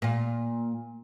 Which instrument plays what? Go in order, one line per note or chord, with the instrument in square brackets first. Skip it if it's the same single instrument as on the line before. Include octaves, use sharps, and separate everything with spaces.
[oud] A#2 F4